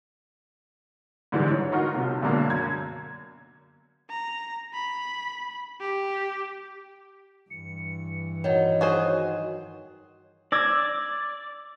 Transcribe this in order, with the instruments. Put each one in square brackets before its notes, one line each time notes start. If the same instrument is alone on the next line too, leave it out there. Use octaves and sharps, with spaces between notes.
[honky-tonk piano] G#2 D3 E3 G3 G#3
C#5
D#4 F4 F#4 A#4
B1 C3
B1 B2 D3 G#3 A#3
F#2 G#6
[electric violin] A#5
B5
G4
[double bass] G2 E3 [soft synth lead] C#7
[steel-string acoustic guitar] D#3 F#3 [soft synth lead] C#5
[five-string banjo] F#4 G#4 C5
[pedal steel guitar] D5 [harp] E6 G#6 A#6